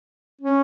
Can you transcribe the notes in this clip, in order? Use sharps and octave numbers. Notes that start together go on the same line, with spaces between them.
C#4